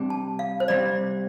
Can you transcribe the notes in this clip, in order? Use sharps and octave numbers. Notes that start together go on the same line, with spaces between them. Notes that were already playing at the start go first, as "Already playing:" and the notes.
Already playing: C3 G3 D4
A5
F5
C5
C3 G3 C4 D5